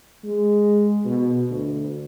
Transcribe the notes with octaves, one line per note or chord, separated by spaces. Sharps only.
G#3
B2
D2